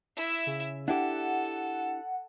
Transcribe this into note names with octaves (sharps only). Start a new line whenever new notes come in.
E4 E5
C#3
D4 E4 G4 A4 F#5